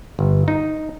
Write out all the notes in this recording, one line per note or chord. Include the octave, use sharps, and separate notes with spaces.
G1
D#4